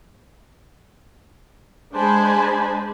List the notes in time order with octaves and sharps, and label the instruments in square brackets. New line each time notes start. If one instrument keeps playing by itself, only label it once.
[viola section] G#3 D4 C5 G#5 A5 B5